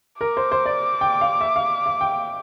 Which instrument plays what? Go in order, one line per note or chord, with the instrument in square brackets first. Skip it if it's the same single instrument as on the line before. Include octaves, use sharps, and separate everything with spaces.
[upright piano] A#4 [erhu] D6
[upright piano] C5
C5
D5
G5
F5
E5
F5
F5
G5